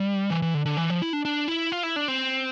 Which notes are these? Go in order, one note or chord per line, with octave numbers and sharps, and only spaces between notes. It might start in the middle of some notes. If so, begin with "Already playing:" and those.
Already playing: G3
E3
E3
D3
D3
E3
F3
E4
D4
D4
E4
F4
E4
D4
C4